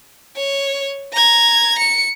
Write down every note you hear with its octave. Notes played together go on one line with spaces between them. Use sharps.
C#5
A#5 G#6
C#7